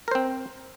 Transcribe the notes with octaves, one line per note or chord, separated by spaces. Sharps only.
C4 A#4 C5